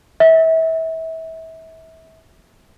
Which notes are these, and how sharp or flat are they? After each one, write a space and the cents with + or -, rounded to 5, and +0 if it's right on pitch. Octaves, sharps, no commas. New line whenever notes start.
E5 -30